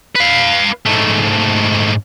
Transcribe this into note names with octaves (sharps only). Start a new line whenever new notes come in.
B4 F5
G#2 A3